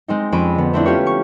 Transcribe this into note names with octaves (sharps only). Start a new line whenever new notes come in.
G#3 C4 D#4
F2 C4 C#4 B5 D7 D#7
D3 B3
A3 C4 D4 E4
C#4 F4 G4 B4 C#5
C#6